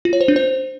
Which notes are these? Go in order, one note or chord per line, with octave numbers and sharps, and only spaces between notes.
F4
C#5
C5
D4
C5